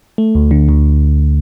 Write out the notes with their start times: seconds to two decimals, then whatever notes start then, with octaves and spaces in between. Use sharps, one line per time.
0.18 A3
0.35 D2
0.51 D3
0.69 D2